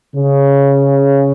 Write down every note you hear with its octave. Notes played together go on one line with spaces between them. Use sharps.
C#3